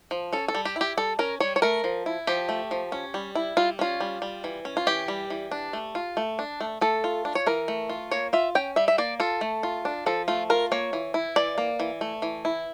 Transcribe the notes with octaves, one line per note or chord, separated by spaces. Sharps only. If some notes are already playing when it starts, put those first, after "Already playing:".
F3
C#4 A4
A4
G3
G4
E4 G4
G3 A4
C#4 A#4
G3 C#5
C#5
A3 A#4
F3
E4
F3 G4
A3
F3
C#4
G3
E4
G3 F4
C#4 F4
G3
G3
E3
C#4
F4
E3 G4
G3
E3
D4
A3
F4
A3
D4
A3
A3 A4
F4
D4
C#5
E3 A#4
A3
F4
A#3 C#5
F4 E5
C#4 G5
G3 E5
E5
A#3 D5
F4 A4
A3
F4
D4
F3 A4
A3 F4
F4 A#4
A#3 C#5
E3
E4
E3 D5
A#3
E3
A3
E3
E4